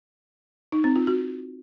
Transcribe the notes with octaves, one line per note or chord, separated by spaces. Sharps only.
D#4
C4
F4
F#4